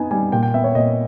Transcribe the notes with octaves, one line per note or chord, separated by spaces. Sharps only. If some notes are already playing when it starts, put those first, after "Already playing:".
Already playing: B3 D#4 G#5
G3 G#5
A#2 G5
G5
B3 E5
C#5
A#2 D#5